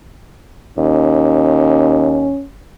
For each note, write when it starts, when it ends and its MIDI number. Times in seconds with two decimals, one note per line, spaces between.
0.78 2.33 39
0.78 2.44 61